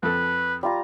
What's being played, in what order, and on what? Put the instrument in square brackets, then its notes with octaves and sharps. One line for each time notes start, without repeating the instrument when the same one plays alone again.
[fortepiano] F2 A4 [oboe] B4
[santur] G3 F4 A#5